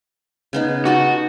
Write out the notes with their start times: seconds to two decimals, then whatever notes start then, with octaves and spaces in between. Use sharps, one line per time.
0.53 C#3 B3 D#4
0.85 D#4 F#4 D#5 A5